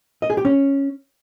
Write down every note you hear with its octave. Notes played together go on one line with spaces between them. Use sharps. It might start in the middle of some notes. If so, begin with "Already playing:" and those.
D#5
G#4
G4
C#4